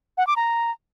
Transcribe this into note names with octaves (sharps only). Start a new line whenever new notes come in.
F#5
D6
A#5